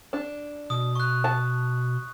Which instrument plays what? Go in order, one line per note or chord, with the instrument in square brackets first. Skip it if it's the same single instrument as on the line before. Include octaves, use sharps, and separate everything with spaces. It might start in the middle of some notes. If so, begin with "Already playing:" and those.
[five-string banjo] D4
[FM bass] B2 [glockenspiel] D#6
[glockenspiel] C#6 F#6
[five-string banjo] A5